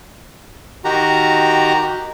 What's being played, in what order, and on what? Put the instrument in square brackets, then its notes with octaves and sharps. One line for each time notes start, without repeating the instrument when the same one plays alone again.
[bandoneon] D#3 F#4 G4 A#5